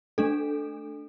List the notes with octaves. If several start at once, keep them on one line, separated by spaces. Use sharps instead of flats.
A3 D4 A4